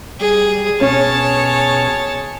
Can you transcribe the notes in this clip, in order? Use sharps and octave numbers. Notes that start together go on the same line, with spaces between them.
G3 G#4
B2 C#4 G#4 C#5 A5